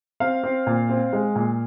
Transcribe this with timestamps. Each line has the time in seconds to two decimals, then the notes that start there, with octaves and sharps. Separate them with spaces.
0.20 C4 F5
0.43 C4
0.67 A#2
0.89 C4
1.13 G#3
1.35 A#2